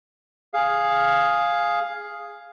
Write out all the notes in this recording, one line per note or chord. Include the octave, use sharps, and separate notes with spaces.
G#4 F5